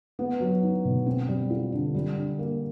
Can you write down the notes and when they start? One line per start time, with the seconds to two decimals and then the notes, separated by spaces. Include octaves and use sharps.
0.19 B3
0.40 F#3
0.63 D#4
0.85 B2
1.06 C4
1.29 G3
1.50 F4
1.72 D3
1.94 G3
2.16 D3
2.39 A#3